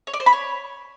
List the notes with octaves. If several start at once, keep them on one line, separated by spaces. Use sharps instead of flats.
C#5
D5
C5
B5
C#5